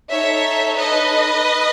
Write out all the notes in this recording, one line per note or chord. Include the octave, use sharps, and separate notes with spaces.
D#4 A4 C#5 E5
B4 D#5